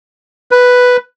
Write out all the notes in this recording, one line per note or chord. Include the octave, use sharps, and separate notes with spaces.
B4